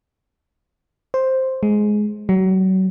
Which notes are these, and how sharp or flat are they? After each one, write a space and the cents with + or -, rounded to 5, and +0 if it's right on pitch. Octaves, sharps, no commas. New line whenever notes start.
C5 +5
G#3 +15
F#3 +30